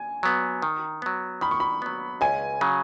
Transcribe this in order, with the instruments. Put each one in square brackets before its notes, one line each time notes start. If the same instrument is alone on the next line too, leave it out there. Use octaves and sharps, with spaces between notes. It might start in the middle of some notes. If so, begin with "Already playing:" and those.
Already playing: [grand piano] G#5
[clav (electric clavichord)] F#3 B3
D#3
F#3 B3
[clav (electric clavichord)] D#3 [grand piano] B5
[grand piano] C#6
B5
[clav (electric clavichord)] F#3 B3
[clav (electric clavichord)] C#2 [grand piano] G#5
[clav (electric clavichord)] C#3 F#3